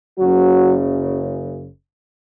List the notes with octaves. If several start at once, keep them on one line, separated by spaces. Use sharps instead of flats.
F#1 F#2 C#3 F#3 F#4